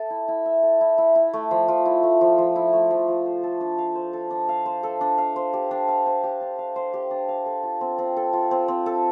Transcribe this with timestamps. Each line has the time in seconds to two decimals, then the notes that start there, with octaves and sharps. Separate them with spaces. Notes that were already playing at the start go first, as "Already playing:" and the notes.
Already playing: A4 E5
0.10 E4
0.28 E4
0.46 E5
0.63 A4
0.81 E4
0.98 E4
1.15 E4
1.33 A3
1.51 F3
1.68 F3
1.86 E4
2.03 A3
2.21 F3
2.38 F3
2.56 E4
2.73 A3
2.91 F3
3.08 F3
3.26 C5
3.43 A4
3.61 D4
3.78 F5
3.95 C5
4.13 A4
4.30 D4
4.49 F5
4.66 C5
4.83 A4
5.01 D4
5.18 F5
5.36 C5
5.53 G4
5.71 D4
5.88 F5
6.06 C5
6.23 G4
6.41 D4
6.59 F5
6.76 C5
6.94 G4
7.11 D4
7.28 F5
7.46 A4
7.63 F4
7.81 C4
7.98 C4
8.17 A4
8.33 F4
8.51 C4
8.68 C4
8.86 A4